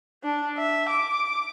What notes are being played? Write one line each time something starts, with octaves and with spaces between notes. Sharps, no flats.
D4
E5
D6